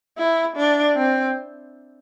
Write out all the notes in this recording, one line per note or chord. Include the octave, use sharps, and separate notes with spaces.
E4
D4
C4